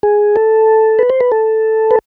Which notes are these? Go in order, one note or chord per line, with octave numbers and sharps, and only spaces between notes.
G#4
A4
B4
C5
B4
A4
B4